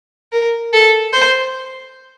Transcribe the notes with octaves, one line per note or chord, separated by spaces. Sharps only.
A#4
A4
C5